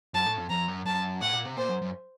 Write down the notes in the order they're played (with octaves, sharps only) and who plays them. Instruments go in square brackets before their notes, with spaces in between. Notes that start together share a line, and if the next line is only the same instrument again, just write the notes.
[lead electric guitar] F#2 [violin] A5
[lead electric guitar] A2
F2
[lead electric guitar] F2 [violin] A#5
[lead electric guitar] F#2
[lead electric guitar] F#2 [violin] A5
[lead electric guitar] A2 [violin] F#5
[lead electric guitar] A#2
C3
[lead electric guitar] A#2 [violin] C5
[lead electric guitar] F#2
F#2